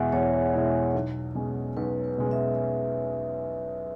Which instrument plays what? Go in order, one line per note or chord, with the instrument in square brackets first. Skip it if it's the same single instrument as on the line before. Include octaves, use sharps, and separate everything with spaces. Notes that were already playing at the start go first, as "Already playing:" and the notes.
Already playing: [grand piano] E2 B2 G#3 E4 [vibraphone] E5 F#5 G#5
[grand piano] E2 [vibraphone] C#5
[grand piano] B2 G#3 E4
B1
B2 G#3 C#4
[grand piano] B1 [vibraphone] B4
[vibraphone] B4
[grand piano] B2 G#3 C#4
[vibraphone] E5